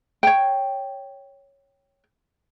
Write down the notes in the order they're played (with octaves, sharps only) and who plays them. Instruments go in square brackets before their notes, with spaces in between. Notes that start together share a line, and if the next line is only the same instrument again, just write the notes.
[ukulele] C#5 G5